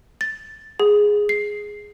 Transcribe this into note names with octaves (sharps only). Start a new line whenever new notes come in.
A6
G#4
C7